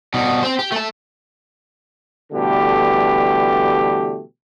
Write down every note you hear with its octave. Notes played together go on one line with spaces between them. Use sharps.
B2 G3
C4 C5
G4
A3 A5
B2 D3 E3 G3 A3 G4